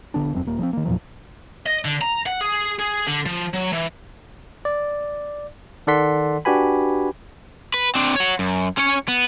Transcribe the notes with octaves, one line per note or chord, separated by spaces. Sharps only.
A#1 D3 B3 D4
E1 F#2 C4
D#1 A#3
F3 G#3 C4
D#3 A#3
E2 A#2 F3 F#3
D#5
D3
A#5
F#5
G#4
G#4
D3
F3
F#3
E3
D5
D#3 A4 D5 F#5 C6 B6
D4 F#4 G4 B4 G#5 B5
B4
C4 D4
C#5 F#5
F#2
C#4 C#5
B3